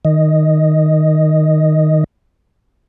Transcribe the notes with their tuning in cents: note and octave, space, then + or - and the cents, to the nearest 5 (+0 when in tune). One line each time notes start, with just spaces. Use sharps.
D#3 +0 D#5 +0